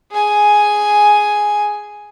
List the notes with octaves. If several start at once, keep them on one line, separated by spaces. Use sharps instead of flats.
G#4 G#5